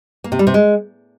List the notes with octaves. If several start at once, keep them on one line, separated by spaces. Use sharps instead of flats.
A#3
C3
G3
C3
G#3